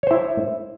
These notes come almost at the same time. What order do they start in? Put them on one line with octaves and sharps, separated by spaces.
C#5 C5 E4